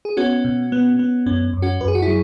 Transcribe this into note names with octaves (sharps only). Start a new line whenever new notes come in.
G#4
B3 C#4 F#4
B2
B3
B3
F#2 C#4
F#2
C#4 F#4
F#2 B4
G#4
F#4
E4 G#4
F#3